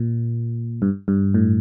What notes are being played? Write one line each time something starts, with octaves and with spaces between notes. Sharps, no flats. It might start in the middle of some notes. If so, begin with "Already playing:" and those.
Already playing: A#2
G2
G2
A2